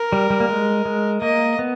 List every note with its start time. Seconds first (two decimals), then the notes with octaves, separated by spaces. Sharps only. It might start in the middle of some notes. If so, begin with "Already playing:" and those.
Already playing: A#4
0.13 G3
0.30 G3
0.40 A#3
0.49 G#3
0.85 G#3
1.22 A#3 D#5
1.59 B3